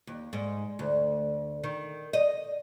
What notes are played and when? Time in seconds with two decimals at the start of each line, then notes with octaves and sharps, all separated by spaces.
0.07 D#2
0.33 G#2
0.79 D2
1.64 D#3
2.13 D#5